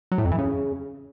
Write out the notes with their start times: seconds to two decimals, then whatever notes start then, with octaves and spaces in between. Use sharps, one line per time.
0.12 F#3
0.18 A2
0.25 F2
0.32 E3
0.38 C#3